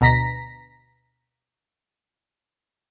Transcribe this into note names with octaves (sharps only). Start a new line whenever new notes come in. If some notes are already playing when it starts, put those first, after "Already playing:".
D2 B2 A#5 A#6 B6